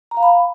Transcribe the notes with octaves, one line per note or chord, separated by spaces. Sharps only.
A#5
F5
B5